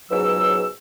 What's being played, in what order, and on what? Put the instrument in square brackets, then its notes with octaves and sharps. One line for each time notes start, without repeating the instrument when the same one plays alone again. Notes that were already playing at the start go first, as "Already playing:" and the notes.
[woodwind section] C#2 G#2 B2 F#3 E6